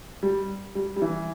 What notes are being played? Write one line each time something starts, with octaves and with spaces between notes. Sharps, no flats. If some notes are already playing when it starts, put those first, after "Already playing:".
G3
G3
G3
E3